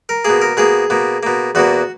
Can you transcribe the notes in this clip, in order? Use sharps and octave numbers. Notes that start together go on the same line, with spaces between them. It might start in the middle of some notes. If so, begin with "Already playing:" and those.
A#4
B2 A#3 G#4
A#4
B2 A#3 G#4
B2 A#3
B2 A#3
E2 B2 A#3 F#4